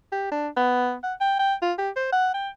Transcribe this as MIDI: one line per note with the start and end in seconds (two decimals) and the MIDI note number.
0.12 0.29 67
0.32 0.48 62
0.57 0.95 59
1.04 1.14 78
1.21 1.39 79
1.39 1.54 79
1.62 1.73 65
1.78 1.90 67
1.96 2.10 72
2.12 2.30 78
2.34 2.49 79